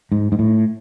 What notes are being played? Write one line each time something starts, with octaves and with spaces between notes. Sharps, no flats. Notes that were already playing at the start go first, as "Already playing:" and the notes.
G#2
G#2
A2